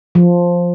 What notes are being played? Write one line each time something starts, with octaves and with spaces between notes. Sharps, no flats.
F3